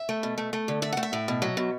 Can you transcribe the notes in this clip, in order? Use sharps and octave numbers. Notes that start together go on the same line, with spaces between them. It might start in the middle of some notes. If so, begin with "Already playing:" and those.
Already playing: E5
A3
B2
A3
A3
D3
A3 E5
A3 F#5
E5
A2
B2
F#3
B2